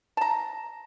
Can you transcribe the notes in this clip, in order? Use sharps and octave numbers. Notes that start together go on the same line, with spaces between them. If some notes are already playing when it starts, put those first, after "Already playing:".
A5 A#5